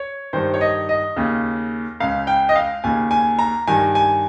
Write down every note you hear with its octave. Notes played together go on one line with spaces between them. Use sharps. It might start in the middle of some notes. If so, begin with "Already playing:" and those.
Already playing: C#5
G2 D#3 C5
C#5
D#5
D#5
D#2 C#3
C#2 C#3 F5
G5
D#5
F5
D#2 C#3 G#5
G#5
A#5
G2 D#3 G#5
G#5